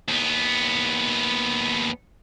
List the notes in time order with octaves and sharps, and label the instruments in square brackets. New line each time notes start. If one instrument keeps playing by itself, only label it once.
[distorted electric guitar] D#2 B3